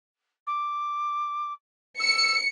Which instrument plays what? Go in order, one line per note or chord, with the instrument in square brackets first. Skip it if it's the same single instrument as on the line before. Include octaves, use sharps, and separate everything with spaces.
[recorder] D6
[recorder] E6 [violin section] C#7